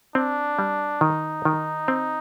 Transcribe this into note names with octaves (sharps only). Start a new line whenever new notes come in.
C4 D4
G3
D#3 D#4
D#3
C4